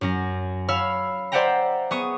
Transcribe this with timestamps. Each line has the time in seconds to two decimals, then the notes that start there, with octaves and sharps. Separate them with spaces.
0.01 F#2 C#4 A#6
0.68 C#5 F5 B5 E6 F6
1.32 C5 D5 E5 F#5 G5 A#5
1.91 B3 G#4 C#6 D#6